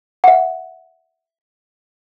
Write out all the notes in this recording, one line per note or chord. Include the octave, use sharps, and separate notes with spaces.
E5 F#5